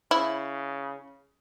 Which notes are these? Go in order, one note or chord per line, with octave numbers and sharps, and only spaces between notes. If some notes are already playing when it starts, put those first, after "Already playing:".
C#3 E4